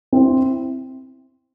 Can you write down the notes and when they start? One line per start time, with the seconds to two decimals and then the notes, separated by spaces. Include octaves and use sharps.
0.12 C4 E4